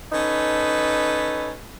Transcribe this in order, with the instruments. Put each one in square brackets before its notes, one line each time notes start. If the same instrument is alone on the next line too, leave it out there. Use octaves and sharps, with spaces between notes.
[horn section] C#4 D#4 A4 B4